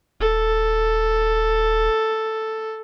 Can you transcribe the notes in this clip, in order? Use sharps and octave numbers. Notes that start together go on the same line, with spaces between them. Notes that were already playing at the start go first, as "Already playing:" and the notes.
D#1 A4